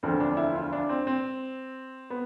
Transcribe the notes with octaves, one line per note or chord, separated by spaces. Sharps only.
E1 D2 D3 F3 C4
D4
E4
F4
D4
C4
C4
B3